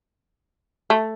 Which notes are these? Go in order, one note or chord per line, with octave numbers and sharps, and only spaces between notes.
A3